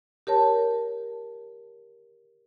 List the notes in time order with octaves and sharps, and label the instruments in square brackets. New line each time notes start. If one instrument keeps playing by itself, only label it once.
[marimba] G4 A#4 C#5 A5